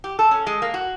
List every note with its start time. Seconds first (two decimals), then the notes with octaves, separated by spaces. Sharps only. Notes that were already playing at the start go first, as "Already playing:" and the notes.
0.04 G4
0.19 A4
0.31 C#4
0.47 G#3
0.62 A#3
0.74 F#4